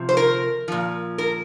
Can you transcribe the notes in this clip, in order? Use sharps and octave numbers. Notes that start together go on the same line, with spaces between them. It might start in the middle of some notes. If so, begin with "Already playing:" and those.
Already playing: C3 F3
C5
A#4
A#2 F3
A#4